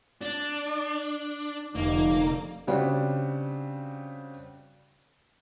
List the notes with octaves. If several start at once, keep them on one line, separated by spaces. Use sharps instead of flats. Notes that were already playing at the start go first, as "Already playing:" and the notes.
D4
F1 D3 A#3 D#4
C#3 G3 C4 D4 F#4